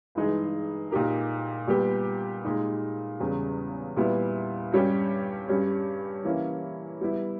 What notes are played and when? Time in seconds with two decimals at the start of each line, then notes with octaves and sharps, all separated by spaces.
0.15 G2 E3 G#3 D#4 G#4
0.91 A#2 A#3 D#4 G4 A#4
1.67 A#2 G3 B3 G4
2.44 A#2 G#3 D#4
3.20 E2 C#3 G3
3.96 A#2 G3 B3 E4
4.72 G2 G3 C#4 G4
5.48 G2 G3 C#4 G4
6.24 E3 A#3 C#4 E4
7.01 G3 B3 E4